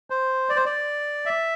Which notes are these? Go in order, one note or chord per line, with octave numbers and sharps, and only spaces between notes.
C5
D5
C5
D5
E5